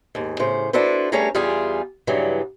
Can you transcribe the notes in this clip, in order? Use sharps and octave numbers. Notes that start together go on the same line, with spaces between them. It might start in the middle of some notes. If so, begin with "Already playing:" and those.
D#2 G#2
A2 C#3 C5
D4 E4 F#4 A4 B4 C5
G3 A3 C#4 G#4 C#5 A#5
E2 G3 F4 G4 G#4
G2 C#3 E3 F#3 G3